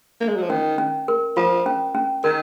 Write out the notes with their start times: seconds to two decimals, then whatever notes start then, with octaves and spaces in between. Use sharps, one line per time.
0.21 A#3
0.28 G#3
0.36 F#3
0.42 F3
0.50 D#3 C#4
0.78 C#4
1.08 A#4
1.36 F3 F4
1.66 C#4
1.95 C#4
2.24 D#3 A#4